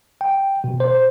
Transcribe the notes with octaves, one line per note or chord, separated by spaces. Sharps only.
G5
B2
C5